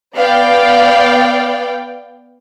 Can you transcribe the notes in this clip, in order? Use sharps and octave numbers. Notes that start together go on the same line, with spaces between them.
B3 D5 F5 G5